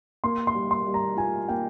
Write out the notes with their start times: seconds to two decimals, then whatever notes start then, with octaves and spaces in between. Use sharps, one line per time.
0.24 A#3 C6
0.47 C6
0.54 G3
0.71 C6
0.86 G3
0.94 A#5
1.17 F4 G#5
1.48 A#3 G5